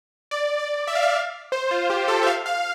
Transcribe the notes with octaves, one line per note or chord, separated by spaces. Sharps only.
D5
D5
E5
F5
E5
F5
C5
F4
G4
A4
E5
F5
F5